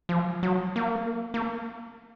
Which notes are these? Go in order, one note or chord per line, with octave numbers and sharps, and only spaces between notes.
F3
F#3
A#3
A#3